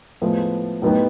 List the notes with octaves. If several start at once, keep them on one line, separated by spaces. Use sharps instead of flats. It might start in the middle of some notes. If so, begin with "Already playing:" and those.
A2 F3 G#3 B3
A2 F#3 B3 D#4 G4